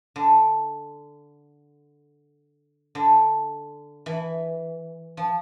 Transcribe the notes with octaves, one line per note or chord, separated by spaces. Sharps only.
D3
D3
E3
F3